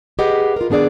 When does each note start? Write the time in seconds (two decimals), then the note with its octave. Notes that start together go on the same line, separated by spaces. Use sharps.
0.19 G4 G#4 B4 D#5 F#5
0.56 F4 A#4
0.70 D#3 B3 D4 G#4 D5